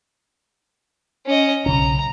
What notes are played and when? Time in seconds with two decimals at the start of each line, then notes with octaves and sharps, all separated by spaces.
1.26 C#4 D#5
1.66 B1 C#3 C#4 A#5